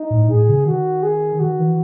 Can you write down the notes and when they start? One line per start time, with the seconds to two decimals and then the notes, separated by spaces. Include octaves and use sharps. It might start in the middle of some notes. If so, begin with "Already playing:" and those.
Already playing: D#4
0.10 A2
0.29 A2 G#4
0.48 C#3
0.66 D#3 F#4
1.03 G#4
1.40 D#3 F#4
1.59 E3